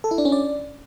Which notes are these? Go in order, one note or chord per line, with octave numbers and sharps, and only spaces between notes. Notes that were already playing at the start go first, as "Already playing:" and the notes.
A4
E4
D4
C#4
D5